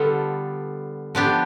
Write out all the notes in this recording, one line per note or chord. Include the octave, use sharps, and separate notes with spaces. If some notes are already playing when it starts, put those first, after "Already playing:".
Already playing: D3 G3 B3 F4 A4
F3 B3 D4 G4